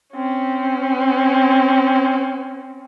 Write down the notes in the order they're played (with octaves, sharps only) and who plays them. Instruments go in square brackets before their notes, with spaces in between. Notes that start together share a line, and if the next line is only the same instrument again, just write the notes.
[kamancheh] C4 C#4